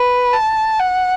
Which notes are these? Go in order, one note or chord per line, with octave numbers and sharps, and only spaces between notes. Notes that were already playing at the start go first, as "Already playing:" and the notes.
Already playing: B4
A5
F#5